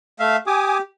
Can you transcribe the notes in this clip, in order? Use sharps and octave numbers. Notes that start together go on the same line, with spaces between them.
A3 E5 F5
G4 G#5 D6 D#6